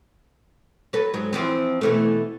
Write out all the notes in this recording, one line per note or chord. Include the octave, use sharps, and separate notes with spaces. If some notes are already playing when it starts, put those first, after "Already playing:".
F#3 A4 B4
G#2 F#3
E3 F3 C4
B2 E3 A3